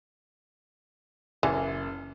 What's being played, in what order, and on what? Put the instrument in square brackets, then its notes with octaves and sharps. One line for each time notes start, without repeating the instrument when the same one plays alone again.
[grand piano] F#1 [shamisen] E3